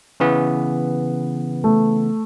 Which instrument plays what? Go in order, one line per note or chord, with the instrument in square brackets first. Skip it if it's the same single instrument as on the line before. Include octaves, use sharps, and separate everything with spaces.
[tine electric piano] C#3 E3 B3
[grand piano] A3